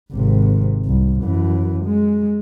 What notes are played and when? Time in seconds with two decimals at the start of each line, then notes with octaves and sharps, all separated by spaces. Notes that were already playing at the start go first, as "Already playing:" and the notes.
0.12 G#1 C3
0.85 C2
1.23 F#2 E3
1.85 G#3